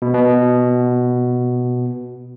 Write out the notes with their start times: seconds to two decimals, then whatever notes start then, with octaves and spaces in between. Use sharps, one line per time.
0.02 B2
0.14 B2